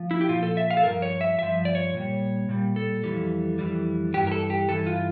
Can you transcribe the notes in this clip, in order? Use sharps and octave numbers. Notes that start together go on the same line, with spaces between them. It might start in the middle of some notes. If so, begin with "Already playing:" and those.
Already playing: F3
E4
G4
A#2 F3 F4
A4
E5
F5
A4
G2 F3 A#4
C#5
E5
G2 F3 E5
D5
C#5
A#2 G3
A#2 G3
A4
F2 E3 G3
F2 E3 G3
G2 E3 G3 G4
A#4
A4
G4
G2 E3 A4
F4